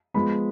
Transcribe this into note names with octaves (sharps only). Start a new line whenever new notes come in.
F3 G#3 B3 B5